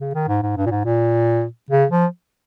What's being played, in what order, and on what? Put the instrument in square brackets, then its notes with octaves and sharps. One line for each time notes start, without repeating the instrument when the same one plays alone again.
[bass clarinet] C#3
D#3
G#2
G#2
G2
A#2
G#2
A#2
C#3
F3